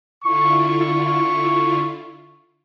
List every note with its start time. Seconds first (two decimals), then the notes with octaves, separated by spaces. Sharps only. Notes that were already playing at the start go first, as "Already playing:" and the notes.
0.24 D3 E4 F4 C#6